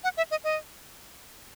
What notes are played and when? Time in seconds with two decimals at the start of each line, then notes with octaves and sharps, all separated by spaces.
0.04 F#5
0.17 E5
0.31 D#5
0.44 D#5